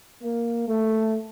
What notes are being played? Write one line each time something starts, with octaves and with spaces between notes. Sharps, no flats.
A#3
A3